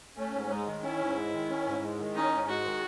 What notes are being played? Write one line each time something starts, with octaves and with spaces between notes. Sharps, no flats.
A3 C#4
G#2
G#3 D#4
D#3
C#4 E4
G#2
G#3
D#3
C#4
G#2
G#3
D#3
C#4 D#4
G#2
G#3 F#4
D#3